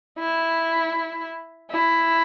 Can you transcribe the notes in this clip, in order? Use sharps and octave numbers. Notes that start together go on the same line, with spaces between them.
E4
E4